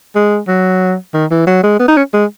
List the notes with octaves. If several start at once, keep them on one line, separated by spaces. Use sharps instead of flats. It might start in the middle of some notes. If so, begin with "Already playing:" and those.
G#3
F#3
D#3
E3
F#3
G#3
B3
D#4
C#4
G#3